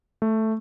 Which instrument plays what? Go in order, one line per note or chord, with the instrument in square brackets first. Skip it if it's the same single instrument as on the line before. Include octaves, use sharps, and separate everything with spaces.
[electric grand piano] A3